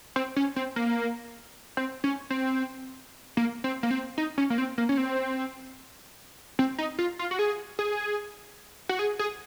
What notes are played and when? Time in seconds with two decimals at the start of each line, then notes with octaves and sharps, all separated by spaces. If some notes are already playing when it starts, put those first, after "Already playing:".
0.16 C4
0.36 C#4
0.56 C4
0.76 A#3
1.77 C4
2.04 C#4
2.30 C4
3.37 A#3
3.64 C4
3.83 A#3
3.91 C4
4.18 D#4
4.38 C#4
4.50 A#3
4.58 C4
4.78 A#3
4.89 C#4
4.97 C4
6.59 C4
6.78 D#4
6.99 F4
7.19 F4
7.31 F#4
7.39 G#4
7.79 G#4
8.89 F#4
8.99 G#4
9.19 G#4